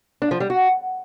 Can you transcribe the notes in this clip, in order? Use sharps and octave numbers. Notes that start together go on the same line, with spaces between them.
D4
F3
G3
F#4